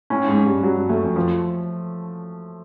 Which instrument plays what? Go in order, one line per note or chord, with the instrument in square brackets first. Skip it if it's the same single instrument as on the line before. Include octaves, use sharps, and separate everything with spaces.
[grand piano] A2 [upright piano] C#4
[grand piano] G#2
[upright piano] C#4
[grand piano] G2
[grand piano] G2 [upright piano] F#3
[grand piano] G2
[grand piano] F#2 [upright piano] A3
[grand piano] F2
[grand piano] F2 [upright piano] F3